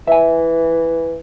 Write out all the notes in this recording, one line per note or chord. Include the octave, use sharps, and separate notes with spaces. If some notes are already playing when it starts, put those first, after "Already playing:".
E3 E5 G#5